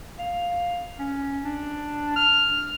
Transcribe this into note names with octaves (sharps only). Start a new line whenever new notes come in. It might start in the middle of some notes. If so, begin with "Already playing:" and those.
F5
C#4
D4
F6